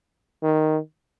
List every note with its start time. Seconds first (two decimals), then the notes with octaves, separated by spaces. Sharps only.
0.43 D#3